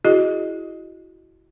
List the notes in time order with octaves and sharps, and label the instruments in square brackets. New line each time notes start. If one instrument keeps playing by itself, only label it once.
[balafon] E4 F#4 G#4 D#5